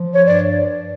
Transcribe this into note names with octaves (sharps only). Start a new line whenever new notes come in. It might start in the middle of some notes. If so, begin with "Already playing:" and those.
Already playing: F3
C#5
G2 D5